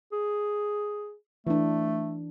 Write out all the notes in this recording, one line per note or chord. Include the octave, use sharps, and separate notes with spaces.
G#4
E3 A3 D4